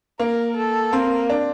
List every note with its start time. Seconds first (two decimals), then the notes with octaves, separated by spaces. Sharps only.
0.20 A#3 A#4
0.57 A4
0.93 A#3 C4
1.30 D4